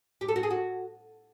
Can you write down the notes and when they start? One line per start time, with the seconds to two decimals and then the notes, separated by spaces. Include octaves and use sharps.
0.21 G4
0.28 A4
0.36 F#4
0.43 G#4
0.50 F#4